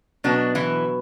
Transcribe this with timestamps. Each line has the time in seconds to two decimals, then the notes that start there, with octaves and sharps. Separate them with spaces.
0.24 B2 F#3 B3 D4
0.55 E3 E4